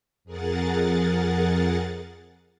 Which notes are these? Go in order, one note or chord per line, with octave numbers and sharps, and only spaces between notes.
F2 G#4 A#4 F#5 A6